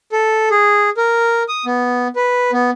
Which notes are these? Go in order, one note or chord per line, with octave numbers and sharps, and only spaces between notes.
A4
G#4
A#4
D#6
B3
B4
B3